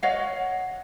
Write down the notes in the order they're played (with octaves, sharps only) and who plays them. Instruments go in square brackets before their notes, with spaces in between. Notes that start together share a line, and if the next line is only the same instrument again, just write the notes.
[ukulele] C#5 D#5 F5 F#5